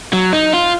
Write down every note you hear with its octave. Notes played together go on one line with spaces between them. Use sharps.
F#3
D#4
F4